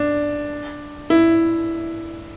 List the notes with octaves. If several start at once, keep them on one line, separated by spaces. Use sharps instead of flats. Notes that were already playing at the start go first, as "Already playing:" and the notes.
Already playing: D4
E4